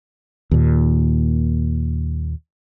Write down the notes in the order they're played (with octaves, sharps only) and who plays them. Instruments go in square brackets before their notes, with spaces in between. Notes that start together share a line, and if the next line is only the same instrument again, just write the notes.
[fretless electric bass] D#2 A#2